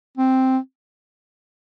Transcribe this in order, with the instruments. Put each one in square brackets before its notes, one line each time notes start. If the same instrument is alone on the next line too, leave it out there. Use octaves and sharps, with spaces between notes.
[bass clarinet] C4